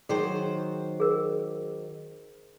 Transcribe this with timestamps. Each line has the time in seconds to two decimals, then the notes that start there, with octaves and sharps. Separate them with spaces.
0.09 D#3 F#3 G#4 C5
1.00 G#4 A#4